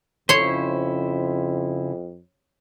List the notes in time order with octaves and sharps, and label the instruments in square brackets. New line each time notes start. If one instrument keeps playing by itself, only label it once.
[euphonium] F2 [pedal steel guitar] C#3 E4 C5 [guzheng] C#5 C6